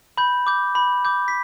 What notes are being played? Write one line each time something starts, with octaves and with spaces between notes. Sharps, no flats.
B5 G6
D6 G6
B5
D6 G6
B6